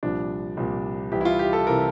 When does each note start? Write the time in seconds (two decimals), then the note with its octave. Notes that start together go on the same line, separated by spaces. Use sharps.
0.03 C2 A#2 F3 D4
0.57 C2 A#2 F3
1.12 C2 C3 E3 G4
1.21 E4
1.25 F4
1.39 G4
1.53 A4
1.67 C3 E3 A#4